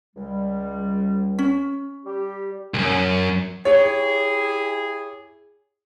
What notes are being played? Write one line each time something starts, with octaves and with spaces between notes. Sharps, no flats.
C#2 G3
C#4
G3 G4
C2 F#2
E4 G4 G#4 C#5